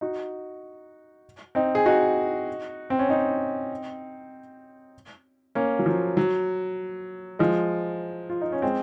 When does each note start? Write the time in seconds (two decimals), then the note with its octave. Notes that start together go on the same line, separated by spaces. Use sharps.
0.01 D#4 F#4
1.55 C4 D#4
1.75 G#4
1.86 D#4 F#4
2.90 C4
2.99 C#4
3.09 C4 D#4
5.55 A#3 C#4
5.79 F#3
5.86 F3
6.17 F#3
7.39 F3 G#3
8.30 F4
8.41 D#4
8.52 C#4
8.62 G#3 C4